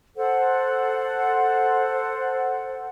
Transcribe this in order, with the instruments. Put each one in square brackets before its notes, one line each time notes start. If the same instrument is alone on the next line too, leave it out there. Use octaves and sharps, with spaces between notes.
[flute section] A4 C5 F#5